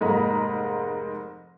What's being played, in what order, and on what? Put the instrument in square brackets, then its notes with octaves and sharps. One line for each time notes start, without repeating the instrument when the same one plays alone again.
[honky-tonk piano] F1 G#2 A#3 D#5 A#5 B5